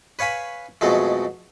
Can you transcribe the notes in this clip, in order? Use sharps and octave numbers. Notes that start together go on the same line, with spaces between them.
B4 C#5 F5 G#5 B5
F2 B2 F#3 G#3 A3